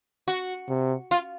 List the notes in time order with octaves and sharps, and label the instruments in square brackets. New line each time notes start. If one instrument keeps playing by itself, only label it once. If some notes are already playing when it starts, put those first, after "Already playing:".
[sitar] F#4
[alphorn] C3
[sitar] F4